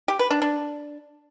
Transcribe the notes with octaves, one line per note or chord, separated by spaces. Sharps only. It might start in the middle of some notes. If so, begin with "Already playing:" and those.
G4
B4
D4
D4